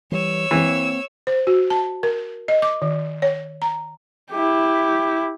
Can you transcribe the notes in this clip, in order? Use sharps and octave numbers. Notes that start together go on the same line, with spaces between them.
E3 G3 C#5 E6
E3 A#3 C4
C5
F#4
A5
A#4
D#5
D6
D#3
C#5
A#5
E4 G4